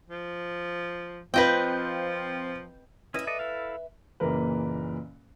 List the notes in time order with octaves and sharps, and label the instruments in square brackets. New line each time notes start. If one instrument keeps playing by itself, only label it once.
[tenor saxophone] F3
[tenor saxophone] F3 [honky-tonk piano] C4 F4 G6 [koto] B4 D#5 G5
[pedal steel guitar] C#4 E4 D#5 [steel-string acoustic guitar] B4 E5
[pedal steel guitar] A4 D5 D#5
E4 A4 F5
[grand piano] F#1 A#2 E3 A#4 B4